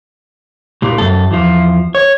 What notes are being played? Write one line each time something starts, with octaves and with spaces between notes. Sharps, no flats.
C2 A#2
F#2 A4
E2 F3
C#5